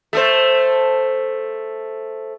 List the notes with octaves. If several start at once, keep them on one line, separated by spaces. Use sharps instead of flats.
A3 A4 C5